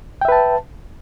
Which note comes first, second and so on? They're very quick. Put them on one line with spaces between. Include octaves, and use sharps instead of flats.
G5 E5 B4 A5